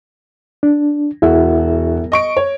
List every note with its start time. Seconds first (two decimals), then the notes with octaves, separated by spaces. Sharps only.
0.63 D4
1.22 E1 E4 F#4 G#4 E5
2.12 D#5 C#6 D7
2.37 C#5